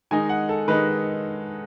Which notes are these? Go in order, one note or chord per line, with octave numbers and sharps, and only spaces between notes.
D#3 G#3 D#4 G#5
F#5
A4
D#3 G#3 D#4 B4